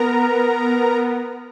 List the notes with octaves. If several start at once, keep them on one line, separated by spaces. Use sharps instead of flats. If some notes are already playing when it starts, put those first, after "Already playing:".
Already playing: B3 A#4 A#5